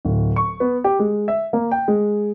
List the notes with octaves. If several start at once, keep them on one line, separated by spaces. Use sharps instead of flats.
D1
C#6
B3
G4
G#3
E5
A#3
G5
G#3